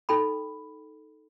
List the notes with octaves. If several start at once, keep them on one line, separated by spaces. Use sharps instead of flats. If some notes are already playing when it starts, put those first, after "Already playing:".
D#4 A4 G5 B5